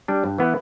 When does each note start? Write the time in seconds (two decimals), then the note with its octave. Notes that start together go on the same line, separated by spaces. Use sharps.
0.08 G3 D4
0.24 G2
0.38 E3 B3 E4